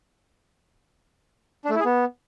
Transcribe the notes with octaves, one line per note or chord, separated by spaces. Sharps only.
D4
A3
E4
G#4
B3